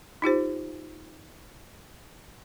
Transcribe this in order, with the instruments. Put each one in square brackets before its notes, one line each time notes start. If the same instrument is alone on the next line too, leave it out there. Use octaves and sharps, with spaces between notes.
[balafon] D#4 F4 G4 C5